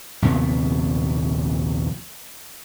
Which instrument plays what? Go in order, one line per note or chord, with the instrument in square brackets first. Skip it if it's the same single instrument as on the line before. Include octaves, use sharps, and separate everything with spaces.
[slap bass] A#1 D#2 C3 B3